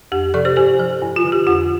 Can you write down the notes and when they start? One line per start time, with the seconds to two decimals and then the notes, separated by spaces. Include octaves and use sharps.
0.12 F2 G4
0.34 C3 F3 A4 D5
0.45 G4 C5
0.56 G2 G4 C5
0.79 F3
1.02 G2
1.16 F4
1.24 D3 F3
1.32 G4
1.47 F2 F4